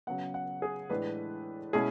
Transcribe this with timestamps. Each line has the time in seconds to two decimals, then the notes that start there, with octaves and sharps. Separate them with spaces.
0.07 C#3 F#3 B3 F#5
0.34 F#5
0.62 G#4
0.90 A2 E3 G#3 D4 B4
1.73 B2 G#3 C#4 E4 G#4